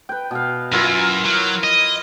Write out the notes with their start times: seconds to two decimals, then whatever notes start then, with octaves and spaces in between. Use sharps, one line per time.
0.09 B4 G5
0.31 B2 F5
0.73 F#2 E4 F4 A#4
1.25 F#3
1.64 D#5